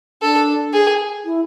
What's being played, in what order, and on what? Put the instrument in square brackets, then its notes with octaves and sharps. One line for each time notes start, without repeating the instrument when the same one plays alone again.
[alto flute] D4 [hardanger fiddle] A4
[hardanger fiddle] G#4
[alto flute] E4